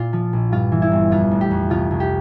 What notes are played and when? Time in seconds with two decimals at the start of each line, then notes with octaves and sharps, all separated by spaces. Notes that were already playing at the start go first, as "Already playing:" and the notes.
Already playing: A#2 F4
0.13 F3
0.33 A#1
0.52 G2 F4
0.72 E3
0.82 E4
0.92 G1
1.11 F2 F4
1.31 F1
1.41 G4
1.51 F2
1.70 C2 F4
1.91 C2
2.00 G4